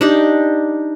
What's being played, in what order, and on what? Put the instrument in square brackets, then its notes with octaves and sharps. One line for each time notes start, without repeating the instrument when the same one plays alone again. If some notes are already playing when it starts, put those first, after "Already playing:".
[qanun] D4 D#4 G4